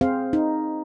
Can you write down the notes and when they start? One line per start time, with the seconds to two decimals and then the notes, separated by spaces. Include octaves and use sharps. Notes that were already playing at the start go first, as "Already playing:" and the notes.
0.01 C4 G#4 C5 F5
0.33 D#4